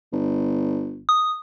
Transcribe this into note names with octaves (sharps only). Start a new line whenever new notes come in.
G1
D#6